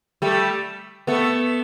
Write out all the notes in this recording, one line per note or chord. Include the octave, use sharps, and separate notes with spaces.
G3 A3
A3 B3